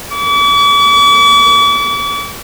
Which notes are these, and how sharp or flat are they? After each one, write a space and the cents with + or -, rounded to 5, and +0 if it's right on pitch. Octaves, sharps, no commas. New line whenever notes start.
D6 -45